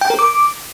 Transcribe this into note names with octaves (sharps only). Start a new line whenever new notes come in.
G5
A#4
D6